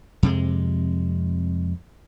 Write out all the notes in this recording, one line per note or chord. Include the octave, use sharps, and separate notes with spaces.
F2 C3 G#3